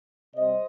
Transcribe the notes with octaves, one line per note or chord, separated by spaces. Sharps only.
C3 G3 C5 D#5